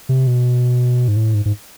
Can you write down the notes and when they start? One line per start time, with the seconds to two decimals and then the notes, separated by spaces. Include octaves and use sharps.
0.09 C3
0.27 B2
1.08 G#2
1.17 A2
1.34 G#2
1.46 G#2